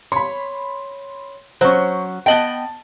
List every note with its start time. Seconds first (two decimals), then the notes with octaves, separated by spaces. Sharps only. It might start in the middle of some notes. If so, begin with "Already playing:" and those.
0.12 C#5 B5 C6
1.61 F#3 C#4 C5 C#5 C#6
2.26 B3 D#5 G5 A5 F#7 G7